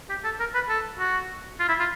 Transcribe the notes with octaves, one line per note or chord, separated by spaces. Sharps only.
G4
A4
A#4
B4
A4
F#4
F4
E4
F4